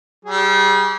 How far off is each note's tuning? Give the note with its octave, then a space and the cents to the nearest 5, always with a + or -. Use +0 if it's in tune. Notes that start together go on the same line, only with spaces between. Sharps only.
G3 -30 G#4 -15